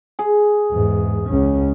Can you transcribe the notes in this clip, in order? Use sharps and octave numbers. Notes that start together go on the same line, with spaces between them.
G#4
E2 G#2
C#2 C#4